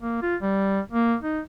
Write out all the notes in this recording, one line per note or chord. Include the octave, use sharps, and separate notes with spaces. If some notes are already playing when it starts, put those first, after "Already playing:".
A#3
F4
G3
A#3
D#4